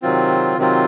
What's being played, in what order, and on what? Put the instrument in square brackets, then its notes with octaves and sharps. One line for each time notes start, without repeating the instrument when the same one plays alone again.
[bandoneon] C3 D#3 F#3 C4 F4
C3 D#3 F#3 C4 F4